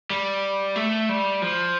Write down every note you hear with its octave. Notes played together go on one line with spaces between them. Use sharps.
G3
A3
G3
F3